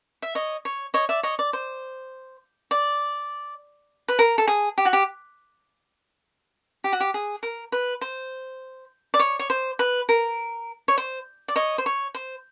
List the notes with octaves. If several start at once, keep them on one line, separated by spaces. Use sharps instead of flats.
E5
C#5 D#5
C#5
C#5 D#5
D5 E5
C#5 D#5
D5
C5
D5
B4
A#4
A4
G#4
G4
F#4
G4
G4
F#4
G4
G#4
A#4
B4
C5
D5
C#5
C#5
C5
B4
A#4
C#5
C5
D5
C#5 D#5
C5
C#5
C5